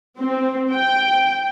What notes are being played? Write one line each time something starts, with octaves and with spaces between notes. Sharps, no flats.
C4
G5